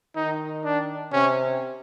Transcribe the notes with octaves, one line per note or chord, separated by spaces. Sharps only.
D#3 D#4
D4
C3 C#4